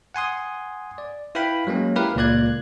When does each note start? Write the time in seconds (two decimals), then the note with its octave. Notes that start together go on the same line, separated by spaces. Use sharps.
0.14 F#5 G#5 C6 D#6
0.98 D5
1.35 E4 B4 F5 G5 B5
1.67 F#3 G#3 A#3 C#4
1.96 E4 G4 A#4 B4 F5
2.16 C#2 A#2 A#3 D5 F#6 G#6